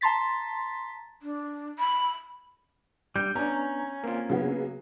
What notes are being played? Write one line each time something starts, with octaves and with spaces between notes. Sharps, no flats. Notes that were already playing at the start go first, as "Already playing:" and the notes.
A5 A#5 C6 A6 B6
D4
B5
G3 G6
B3 C#4 D4 A#5
A#3 C4 F4
C#3 F#3 B3